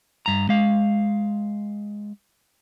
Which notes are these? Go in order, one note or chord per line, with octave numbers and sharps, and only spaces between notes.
G2 A#5
G#3 F5